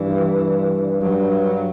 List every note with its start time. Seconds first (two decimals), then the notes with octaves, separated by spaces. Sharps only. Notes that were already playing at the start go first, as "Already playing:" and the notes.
Already playing: G2 E3
1.01 G2 F#3